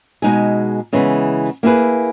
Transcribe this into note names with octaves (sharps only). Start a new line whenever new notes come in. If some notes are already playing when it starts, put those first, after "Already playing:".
B2 G#3 D#4 G#4
C#3 E3 G#3 B3
A#3 E4 G#4 B4